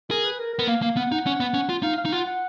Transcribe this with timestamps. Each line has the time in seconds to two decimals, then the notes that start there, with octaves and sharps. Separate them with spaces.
0.10 G#4 A#4
0.25 B4
0.39 A#4
0.54 A#4
0.59 B3
0.67 A#3 F5
0.82 A#3 F5
0.97 B3 F#5
1.11 D#4 F#5
1.26 C#4
1.40 B3
1.54 C#4
1.69 F4
1.83 D#4 F5
1.98 F5
2.05 D#4
2.12 F4 F#5
2.27 F#5